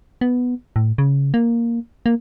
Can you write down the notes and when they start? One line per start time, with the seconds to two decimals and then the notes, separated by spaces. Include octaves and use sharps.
0.21 B3
0.76 A2
0.98 C#3
1.34 A#3
2.06 A#3